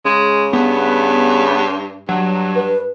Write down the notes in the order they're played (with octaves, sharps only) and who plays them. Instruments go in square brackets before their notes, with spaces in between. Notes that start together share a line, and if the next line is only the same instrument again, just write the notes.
[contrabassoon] C#3 [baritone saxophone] G#3
[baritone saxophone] G2 [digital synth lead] B3
[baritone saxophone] G2 [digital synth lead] F#3
[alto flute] B4